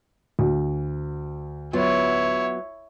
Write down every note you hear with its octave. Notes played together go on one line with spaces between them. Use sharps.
D2
F#3 B3 E4 F4 C#5